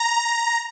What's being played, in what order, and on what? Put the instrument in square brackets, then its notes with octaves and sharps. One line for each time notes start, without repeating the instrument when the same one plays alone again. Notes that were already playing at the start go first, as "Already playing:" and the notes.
Already playing: [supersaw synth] A#5